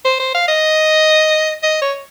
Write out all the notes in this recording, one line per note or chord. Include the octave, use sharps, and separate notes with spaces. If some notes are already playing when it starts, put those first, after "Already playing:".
C5
C5
F5
D#5
D#5
C#5